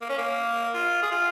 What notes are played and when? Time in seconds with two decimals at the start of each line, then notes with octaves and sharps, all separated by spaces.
0.01 A#3
0.09 C#4
0.18 A#3
0.74 F4
1.03 G#4
1.11 F4